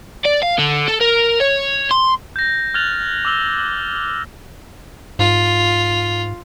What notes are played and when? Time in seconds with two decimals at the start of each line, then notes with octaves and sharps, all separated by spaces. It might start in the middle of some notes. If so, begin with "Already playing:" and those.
0.25 D5
0.42 F5
0.58 D3
0.88 A4
1.01 A#4
1.40 C#5
1.91 C6
2.36 G6 A#6
2.74 F6 F#6 G#6 A6 F7 F#7
3.25 D6 E6 G7
5.19 G#2 F4